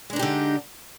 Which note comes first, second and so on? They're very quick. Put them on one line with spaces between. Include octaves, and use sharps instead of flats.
G#3 D4 D#4 G4 D3